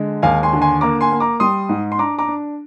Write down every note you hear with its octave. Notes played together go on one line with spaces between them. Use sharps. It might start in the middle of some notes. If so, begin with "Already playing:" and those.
Already playing: D3 G#3
D#2 F5 G#5
G#5 C6
D3
G#5 C6
A#3 A#5 D6
G#5 C6
A#3
A#5 D6
G3 C6 D#6
G#2
C6
D4 A#5 D6
A#5 D6
D4